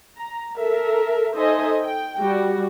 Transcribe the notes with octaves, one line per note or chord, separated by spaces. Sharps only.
A#5
A4 A#4 E5
D#4 A4 C5 D#5 E5 G#5
G5
G3 F#4